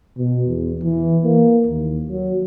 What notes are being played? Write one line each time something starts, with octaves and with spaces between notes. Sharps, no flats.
B2
E2
E3
A#3
D#2
F#3